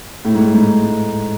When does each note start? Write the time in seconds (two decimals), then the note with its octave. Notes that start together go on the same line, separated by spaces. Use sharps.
0.25 A2
0.35 G#2
0.54 G#2